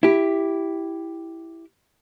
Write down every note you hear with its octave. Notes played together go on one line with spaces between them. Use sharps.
E4 G4